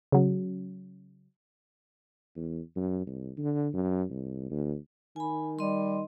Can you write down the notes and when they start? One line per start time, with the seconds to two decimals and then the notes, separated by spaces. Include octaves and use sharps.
0.12 C#3 F#3
2.36 E2
2.76 F#2
3.07 C2
3.38 D3
3.74 F#2
4.10 C2
4.51 D2
5.16 D#3 G#5 B5
5.59 G3 D#5 C6